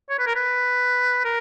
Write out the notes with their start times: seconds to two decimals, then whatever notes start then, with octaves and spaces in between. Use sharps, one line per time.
0.10 C#5
0.19 B4
0.27 A#4
0.36 B4
1.25 A#4